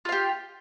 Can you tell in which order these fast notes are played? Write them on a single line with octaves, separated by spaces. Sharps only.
F4 F5 G4